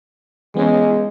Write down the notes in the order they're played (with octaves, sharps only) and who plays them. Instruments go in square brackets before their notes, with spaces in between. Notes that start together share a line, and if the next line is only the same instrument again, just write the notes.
[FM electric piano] E3 B3 C#4 [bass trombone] G#3